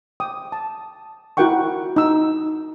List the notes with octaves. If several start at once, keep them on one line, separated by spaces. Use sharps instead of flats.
G5 D6 D#6
A5
E4 F#4 A#4 F#5 G5 C#6
D#4 E6